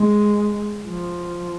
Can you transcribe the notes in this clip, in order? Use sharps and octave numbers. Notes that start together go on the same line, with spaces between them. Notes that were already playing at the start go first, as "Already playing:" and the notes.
Already playing: G#3
F3